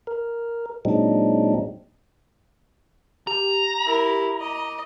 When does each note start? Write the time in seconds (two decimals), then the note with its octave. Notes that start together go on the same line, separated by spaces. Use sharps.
0.07 A#4
0.85 A#2 F#3 G#3 C4 D4 D#4
3.27 G4 A#5
3.85 E4 A#4
4.40 D#5 D6